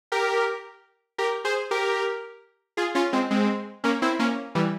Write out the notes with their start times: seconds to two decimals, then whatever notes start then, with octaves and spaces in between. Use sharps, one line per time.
0.12 G4 A#4
1.18 G4 A#4
1.45 G#4 C5
1.71 G4 A#4
2.77 F4 G#4
2.95 C#4 F4
3.13 G#3 C4
3.31 G#3 C4
3.84 A#3 C#4
4.02 C4 E4
4.19 A#3 C#4
4.55 E3 G3